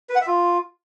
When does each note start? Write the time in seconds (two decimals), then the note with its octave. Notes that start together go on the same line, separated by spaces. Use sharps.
0.10 B4
0.15 F#5
0.21 E5
0.27 F4